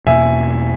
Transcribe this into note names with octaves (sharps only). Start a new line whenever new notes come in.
E2 B2 A#3 E5 G#5